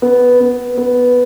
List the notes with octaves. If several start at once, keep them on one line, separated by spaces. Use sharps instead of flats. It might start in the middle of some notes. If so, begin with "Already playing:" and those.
B3
B3
B3